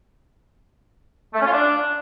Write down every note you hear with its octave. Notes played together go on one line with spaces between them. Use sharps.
A3
C#4
F4
D4